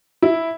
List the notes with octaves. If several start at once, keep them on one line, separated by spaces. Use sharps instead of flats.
E4